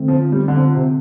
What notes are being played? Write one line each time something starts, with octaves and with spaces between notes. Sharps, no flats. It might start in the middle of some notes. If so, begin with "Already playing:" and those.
Already playing: D3 A3 C4
F3
G3
D3
F3
C3